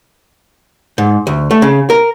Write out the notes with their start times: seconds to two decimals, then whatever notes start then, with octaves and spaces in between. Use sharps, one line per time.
0.98 G#2
1.27 D2
1.51 A3
1.62 C#3
1.90 A#4